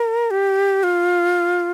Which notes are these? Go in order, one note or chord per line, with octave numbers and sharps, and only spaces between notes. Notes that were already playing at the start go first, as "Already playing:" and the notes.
Already playing: A#4
G4
F4